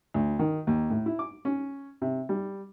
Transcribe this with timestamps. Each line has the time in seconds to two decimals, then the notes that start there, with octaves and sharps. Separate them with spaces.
0.14 D2
0.39 D#3
0.67 D#2
0.90 A2
1.06 E4
1.19 D6
1.45 C#4
2.02 C3
2.29 G3